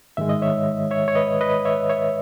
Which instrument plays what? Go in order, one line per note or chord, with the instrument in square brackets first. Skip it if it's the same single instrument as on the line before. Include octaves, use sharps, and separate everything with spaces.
[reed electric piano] G#2 D#3 G#3 E5
D#5
C#5 E5
C#5 E5
C#5
B4 D#5
B4 D#5
C#5 E5
C#5 E5